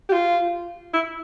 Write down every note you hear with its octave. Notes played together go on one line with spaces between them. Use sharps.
G4
F4
E4